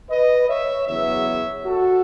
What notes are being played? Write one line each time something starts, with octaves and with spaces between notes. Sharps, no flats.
B4 D#5
C#5 E5
E2 C#3 F#3 B3 C#5 E5
F#4 A4